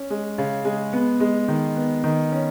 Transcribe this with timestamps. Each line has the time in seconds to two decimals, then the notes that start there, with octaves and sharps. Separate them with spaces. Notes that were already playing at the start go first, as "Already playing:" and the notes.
Already playing: C#4
0.10 G#3
0.38 C#3
0.65 G#3
0.93 B3
1.20 G#3
1.48 D#3
1.76 B3
2.04 D#3
2.32 C#4